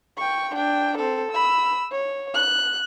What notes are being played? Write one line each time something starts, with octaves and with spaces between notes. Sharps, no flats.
G5 C#6
D4 G5
C4 A4
B5 E6
C#5
F#6